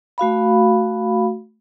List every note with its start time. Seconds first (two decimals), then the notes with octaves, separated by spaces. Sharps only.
0.18 A3 F#4 F5 B5